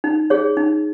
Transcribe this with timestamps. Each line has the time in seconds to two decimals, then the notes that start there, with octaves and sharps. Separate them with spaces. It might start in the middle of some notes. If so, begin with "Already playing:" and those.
0.04 D#4
0.30 G#4 C#5
0.57 D#4